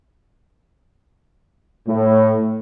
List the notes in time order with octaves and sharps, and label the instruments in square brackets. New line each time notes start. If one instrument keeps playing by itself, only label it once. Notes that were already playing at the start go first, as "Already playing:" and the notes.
[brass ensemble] A2